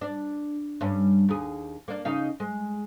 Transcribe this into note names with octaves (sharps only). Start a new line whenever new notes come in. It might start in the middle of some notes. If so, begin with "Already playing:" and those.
D4
G2 C#4
D#2 G#4
A#3 D4
C#3 D#4 F5
G#3